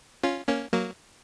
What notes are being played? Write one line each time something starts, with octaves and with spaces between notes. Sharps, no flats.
C#4 F4
A#3 C#4
F#3 A#3